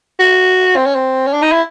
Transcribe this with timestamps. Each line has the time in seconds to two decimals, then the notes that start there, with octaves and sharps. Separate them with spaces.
0.20 F#4
0.76 C4
0.86 C#4
0.95 C4
1.27 C#4
1.33 D4
1.42 D#4
1.52 E4